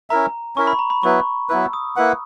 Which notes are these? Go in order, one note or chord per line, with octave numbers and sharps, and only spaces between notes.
C#4 E4 A#4 E5 A#5
C#4 E4 A#4 E5 C#6
B5
A#5
B5
F#3 B3 E4 B4 C#6
F#3 B3 E4 B4 E6
D#6
A#3 E4 B4 F#5